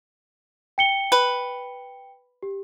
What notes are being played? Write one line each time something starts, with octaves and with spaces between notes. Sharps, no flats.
G5 C#7 G7
B4
G4